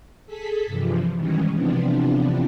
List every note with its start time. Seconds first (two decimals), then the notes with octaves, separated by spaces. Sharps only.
0.26 G#4 A4 B6
0.66 G2 C3 E3 F3
1.15 B2 D#3 E3 G3 G#3 C#4
1.54 C3 E3 F3 B3 C4 D4